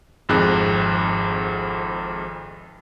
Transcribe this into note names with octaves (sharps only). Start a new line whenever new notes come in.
G#1 F2 G#2 G#4 F#6